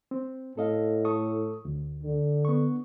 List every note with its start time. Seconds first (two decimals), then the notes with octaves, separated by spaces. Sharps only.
0.11 C4
0.57 A2 A4 D#5 F5
1.05 A4 C#6 D#6
1.65 D2
2.03 D3
2.45 B3 C#6